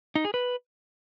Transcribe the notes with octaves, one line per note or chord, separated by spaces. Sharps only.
D#4
G#4
B4